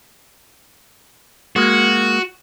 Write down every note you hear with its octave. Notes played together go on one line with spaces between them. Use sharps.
G#3 A#3 F#4